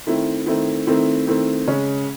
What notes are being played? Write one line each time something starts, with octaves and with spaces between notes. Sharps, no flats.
D#3 A3 C4 E4
D#3 A3 C4 E4
D#3 A3 C4 E4
D#3 A3 C4 E4
C#3 G#3 C#4